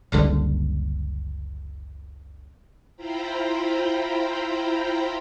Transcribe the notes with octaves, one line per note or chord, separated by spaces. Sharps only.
F#1 C#2 D3 G3
E4 F4 C5 G5 A#5 B5